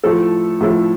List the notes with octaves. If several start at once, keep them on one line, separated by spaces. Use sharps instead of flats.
A2 F3 A3 E4 A4
A2 F3 A3 E4 A4